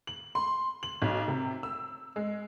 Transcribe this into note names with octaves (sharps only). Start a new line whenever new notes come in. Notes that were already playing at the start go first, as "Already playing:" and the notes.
F#7
C6
F#7
B1
C3
E6
G#3